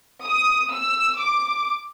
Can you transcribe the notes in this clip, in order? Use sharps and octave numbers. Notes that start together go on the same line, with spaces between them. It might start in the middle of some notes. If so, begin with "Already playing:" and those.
D#6
E6
D6